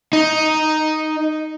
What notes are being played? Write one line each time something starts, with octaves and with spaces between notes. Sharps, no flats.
D#4